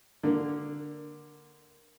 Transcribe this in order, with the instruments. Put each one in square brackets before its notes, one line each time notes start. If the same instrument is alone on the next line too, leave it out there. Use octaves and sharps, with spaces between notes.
[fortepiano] D3 A#3